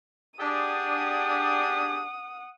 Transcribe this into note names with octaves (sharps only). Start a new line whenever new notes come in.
D4 G4 G#4 F#5 D#6